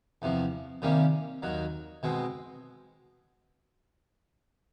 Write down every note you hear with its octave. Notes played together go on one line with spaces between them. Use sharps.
E2 C3 F3
C3 D#3 G3 A#3 C#4
D#2 D#3 F#3
B2 G#3 C4